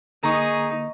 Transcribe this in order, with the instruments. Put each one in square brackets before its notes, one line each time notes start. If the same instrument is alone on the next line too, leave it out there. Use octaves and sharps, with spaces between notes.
[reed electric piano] D3 A#3 D#6 [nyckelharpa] D#4 [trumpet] G#4 [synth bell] A#5 C#6